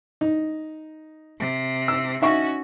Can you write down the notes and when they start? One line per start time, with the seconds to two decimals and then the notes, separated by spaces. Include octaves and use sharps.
0.21 D#4
1.39 C3
1.88 E6
2.22 C#4 D#4 F#4 E5 C#6